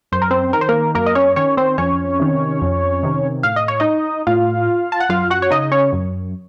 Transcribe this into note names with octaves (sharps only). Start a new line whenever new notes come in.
F#2 C5
A#4
C4 C5
D#3 A#4
C5
A#3 A#4
F#2 A#3 A#4
D#5
C#4 C#5
D#3 C#4 C#5
C4 C5
F2 C#4 C#5
C3 D#3
F2
C3 D#3
A2 F5
D#5
C#5
D#4 D#5
A2 F4 F5
A5
F#5
F#2 F4 F5
F#4 F#5
C#5
C#3 D#4 D#5
C#4 C#5
F#2